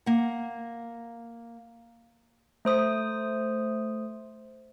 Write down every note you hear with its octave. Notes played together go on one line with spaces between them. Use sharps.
A#3 F#5
A3 C5 D#6